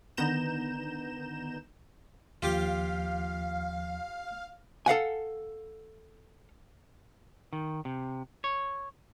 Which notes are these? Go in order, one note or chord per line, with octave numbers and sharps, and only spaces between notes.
D3 D#3 B3 A#5 G6 E7
D#2 F3 F4 G4 F5 D6
A4 F5 F#5 G#5
D#3
C3
C#5